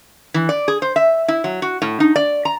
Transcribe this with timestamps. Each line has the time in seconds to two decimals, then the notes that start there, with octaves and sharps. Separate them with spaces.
0.34 E3
0.49 D5
0.68 G#4
0.82 C5
0.96 E5
1.28 E4
1.44 F#3
1.62 F#4
1.82 A2
2.00 D#4
2.16 D5
2.45 A#5